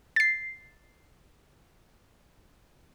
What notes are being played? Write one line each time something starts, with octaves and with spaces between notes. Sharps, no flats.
A6 C7